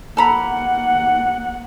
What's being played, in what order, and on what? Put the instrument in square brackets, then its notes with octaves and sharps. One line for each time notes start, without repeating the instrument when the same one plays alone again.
[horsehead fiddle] A#3 F#5 [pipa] A4 A#5 B5